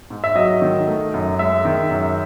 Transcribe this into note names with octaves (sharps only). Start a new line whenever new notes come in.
G#2
E5
F#3 D#5
D#3
A3
F#2
G#3 E5
D#3
F#2